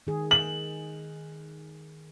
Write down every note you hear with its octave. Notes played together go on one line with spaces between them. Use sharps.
D#3 G#4
F#7